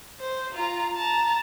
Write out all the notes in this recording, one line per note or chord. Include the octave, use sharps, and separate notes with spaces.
C5
F4 A#5
A5 A#5